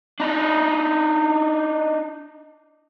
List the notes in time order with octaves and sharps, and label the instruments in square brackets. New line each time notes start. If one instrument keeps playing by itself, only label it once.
[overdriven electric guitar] D4 D#4